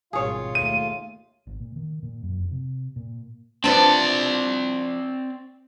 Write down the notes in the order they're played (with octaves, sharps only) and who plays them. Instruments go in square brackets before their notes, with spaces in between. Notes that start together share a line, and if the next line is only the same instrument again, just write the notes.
[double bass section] G#1 B2 G3 [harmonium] F4 F5 [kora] G#4 C#5
[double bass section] D#2 A3 [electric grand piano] D#7
[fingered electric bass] G#1
A#2
D#3
A#2
F#2
F1
C3
A#2
[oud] F3 B3 D4 [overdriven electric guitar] C4 D5